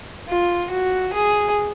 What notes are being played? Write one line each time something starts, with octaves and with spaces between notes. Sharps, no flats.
F4
F#4
G#4